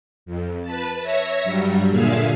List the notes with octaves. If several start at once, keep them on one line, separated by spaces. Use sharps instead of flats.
F2
B4 A5
C#5 E5 A#6
G2 F#3 G3
A#2 D3 G#4 E5 F5